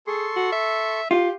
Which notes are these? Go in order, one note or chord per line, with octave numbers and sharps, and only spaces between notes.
G#4 A4 C6 C#6
F#4
E5
F4 G4